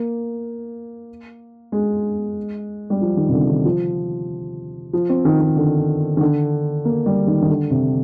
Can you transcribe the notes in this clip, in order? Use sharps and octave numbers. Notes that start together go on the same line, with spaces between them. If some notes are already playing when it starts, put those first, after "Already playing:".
Already playing: A#3
G#3
G3
F3
D#3
C3
D3
D#3
F3
F3
C4
D#3
D#3
D3
D#3
D3
A#3
G3
D#3
D#3
D3
C3